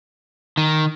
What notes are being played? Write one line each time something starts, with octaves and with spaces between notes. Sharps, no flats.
D#3